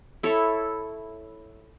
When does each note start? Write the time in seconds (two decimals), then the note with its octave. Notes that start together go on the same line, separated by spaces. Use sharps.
0.23 E4 A4 C#5